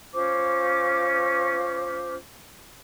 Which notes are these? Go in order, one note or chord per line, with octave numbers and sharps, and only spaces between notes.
C#4 F4 C5 D6